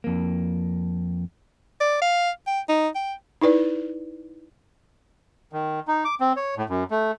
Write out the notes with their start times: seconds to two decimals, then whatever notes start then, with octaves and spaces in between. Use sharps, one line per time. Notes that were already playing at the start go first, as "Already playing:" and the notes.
0.04 F2 A#3
1.80 D5
2.01 F5
2.47 G5
2.68 D#4
2.95 G5
3.41 D#4 E4 B4 D5
5.53 D#3
5.88 D#4
6.05 D6
6.20 C4
6.37 C#5
6.57 A2
6.69 F#2
6.91 A3